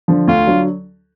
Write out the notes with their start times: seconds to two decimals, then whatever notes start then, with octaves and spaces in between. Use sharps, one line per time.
0.08 D3 F3
0.28 D2 F4
0.47 D3 F#3